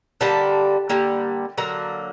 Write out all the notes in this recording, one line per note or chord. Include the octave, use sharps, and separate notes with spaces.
D3 G3 A#3 A5
D3 G3 A#3
D3 F#3 A#3 A#5